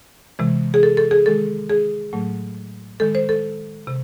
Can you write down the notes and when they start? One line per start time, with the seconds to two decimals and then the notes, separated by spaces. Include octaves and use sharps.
0.39 C3 E3 G#3
0.74 G#4
0.83 A4
0.97 A4
1.11 G#4
1.26 D#3 G#3 A4
1.70 G#4
2.13 A2 F#3 A3
3.00 D#3 G#3 A4
3.15 C5
3.29 A4
3.87 C3